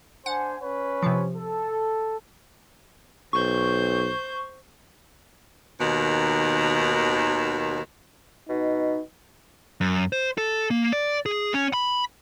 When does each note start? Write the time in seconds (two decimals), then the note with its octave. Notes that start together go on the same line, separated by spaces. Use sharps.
0.26 D4 C5 F#5 G#5
0.62 C#4 B4 C#5
1.03 C3 F3
1.35 A4
3.33 B1 C5 C#6 G6
5.79 D#2 B2 D#3
8.49 B2 D#4
9.81 F#2
10.13 C5
10.38 A4
10.71 A#3
10.93 D5
11.26 G#4
11.54 C#4
11.73 B5